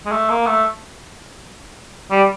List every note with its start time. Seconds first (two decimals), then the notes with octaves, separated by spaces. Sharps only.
0.06 G#3
0.12 A3
0.30 A#3
0.47 A3
2.11 G3